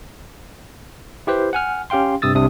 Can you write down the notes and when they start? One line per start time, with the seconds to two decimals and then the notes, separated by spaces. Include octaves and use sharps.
1.27 E4 G4 B4 C5
1.53 F#5 G#5 F6
1.90 C#4 G4 F5 G5 C6
2.22 G2 C3 D#6 E6 A6
2.35 C2 C3 D4 D#6